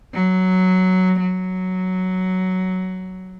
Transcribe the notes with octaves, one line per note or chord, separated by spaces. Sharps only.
F#3
F#3